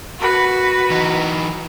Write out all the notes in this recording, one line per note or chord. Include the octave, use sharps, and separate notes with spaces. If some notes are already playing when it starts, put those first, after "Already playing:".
F#4 B4
E3 D#4